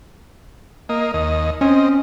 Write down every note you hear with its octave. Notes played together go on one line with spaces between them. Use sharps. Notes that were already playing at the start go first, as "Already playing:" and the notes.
A#3 D#5
D#2 D#5
C4 C#4 D#5